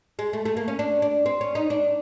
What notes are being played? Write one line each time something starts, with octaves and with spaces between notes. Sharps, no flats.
G#3
A3
A3
A#3
C#4
D4
D4
C4
C#4
D#4
D4